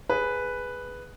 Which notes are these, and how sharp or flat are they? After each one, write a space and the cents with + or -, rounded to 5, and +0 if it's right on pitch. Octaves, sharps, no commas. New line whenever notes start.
G#4 +5 B4 +0